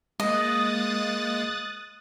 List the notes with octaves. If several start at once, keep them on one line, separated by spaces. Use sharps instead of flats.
G#3 A#3 D#5 D#6 F#6 A6